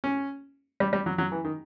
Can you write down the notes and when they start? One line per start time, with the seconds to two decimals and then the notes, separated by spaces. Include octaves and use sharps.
0.04 C#4
0.80 G3
0.93 G3
1.06 F#3
1.18 F#3
1.32 E3
1.45 D#3